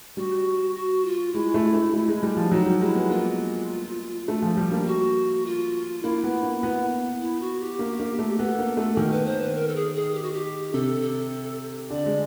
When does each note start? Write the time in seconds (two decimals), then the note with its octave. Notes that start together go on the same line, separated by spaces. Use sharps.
0.17 G3 F#4
0.76 F#4
1.05 F4
1.34 G#3 E4
1.54 A3
1.74 A3
1.94 A3
2.08 G#3
2.23 G3
2.36 F3
2.51 F#3 D#4
2.66 G3
2.81 G#3 E4
2.95 B3
3.10 A#3 F4
4.28 A3
4.42 F3
4.57 G3
4.72 A#3
4.86 F#4
5.46 F4
6.03 A#3 E4
6.24 B3
6.43 A#3
6.63 B3
7.21 E4
7.41 F#4
7.60 G4
7.79 A#3
8.00 A#3
8.19 A3
8.38 B3 A4
8.59 A#3
8.77 A3
8.97 D#3 A#4
9.11 B4
9.26 C5
9.41 B4
9.55 A#4
9.68 A4
9.76 G#4
9.96 G#4
10.14 G4
10.23 F#4
10.32 G4
10.73 C3 A4
11.02 A4
11.90 D3 D5
12.06 G#3